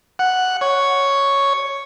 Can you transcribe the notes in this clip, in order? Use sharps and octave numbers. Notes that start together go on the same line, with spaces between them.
F#5
C#5